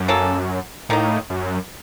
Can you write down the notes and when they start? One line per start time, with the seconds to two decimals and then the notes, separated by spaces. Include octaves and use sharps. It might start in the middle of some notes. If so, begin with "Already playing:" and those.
Already playing: F#2
0.08 A#3 C#4 A4
0.89 A2 D#3 A#3 D#4
1.30 F#2